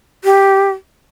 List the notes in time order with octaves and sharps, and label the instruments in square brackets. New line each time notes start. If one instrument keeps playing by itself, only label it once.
[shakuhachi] G4